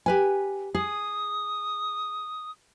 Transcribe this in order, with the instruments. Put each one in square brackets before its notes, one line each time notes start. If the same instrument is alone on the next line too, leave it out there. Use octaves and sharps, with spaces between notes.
[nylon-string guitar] G4 B4 G#5
[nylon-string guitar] G#4 [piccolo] D#6